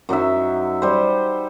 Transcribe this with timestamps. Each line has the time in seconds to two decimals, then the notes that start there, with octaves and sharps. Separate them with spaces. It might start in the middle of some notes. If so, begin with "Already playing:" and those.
0.09 F#2 F#3 D#4 E5
0.82 G3 C5